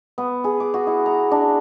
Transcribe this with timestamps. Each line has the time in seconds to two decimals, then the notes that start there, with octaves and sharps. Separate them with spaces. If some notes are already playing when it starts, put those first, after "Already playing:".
0.18 B3
0.44 G#4
0.60 D6
0.74 F#4
0.87 E4
1.06 A#5
1.31 D4